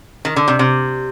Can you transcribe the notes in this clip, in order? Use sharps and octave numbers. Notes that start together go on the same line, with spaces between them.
D#3
D3
C3
C3